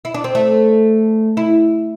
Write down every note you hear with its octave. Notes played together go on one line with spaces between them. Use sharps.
E4
D4
C4
A3
E4